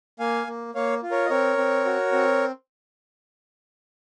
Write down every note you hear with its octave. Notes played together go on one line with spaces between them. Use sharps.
A#3 F5 G#5
A#3
A#3 C#5 F5
F4
A#4 C#5
D#5
C4 A#4 C#5
C4
F#4
C4